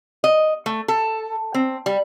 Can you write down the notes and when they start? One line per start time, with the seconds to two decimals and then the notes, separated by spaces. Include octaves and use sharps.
0.24 D#5
0.66 A3
0.88 A4
1.54 C4
1.86 G3